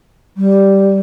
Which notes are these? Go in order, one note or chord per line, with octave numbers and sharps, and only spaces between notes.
G3